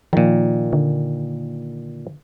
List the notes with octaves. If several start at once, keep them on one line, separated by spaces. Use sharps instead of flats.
A#2 D#3 F3
D3